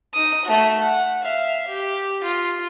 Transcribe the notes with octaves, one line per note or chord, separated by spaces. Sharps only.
D#4 D#6
A3 F#4
F#5
E5 F5
G4
F4